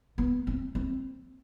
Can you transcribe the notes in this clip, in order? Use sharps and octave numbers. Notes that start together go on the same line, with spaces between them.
B3
C4
C4